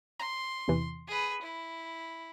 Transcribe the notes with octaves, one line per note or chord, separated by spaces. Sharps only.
A#5 C6
E2 C3 E3
G#4 B4
E4